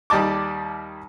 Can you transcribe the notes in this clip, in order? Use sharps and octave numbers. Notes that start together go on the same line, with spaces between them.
D#2 G3 D#5 A5 D6